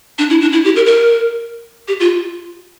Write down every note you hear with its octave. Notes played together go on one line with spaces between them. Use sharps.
D4
E4
D4
E4
G4
A#4
A#4
G4
F4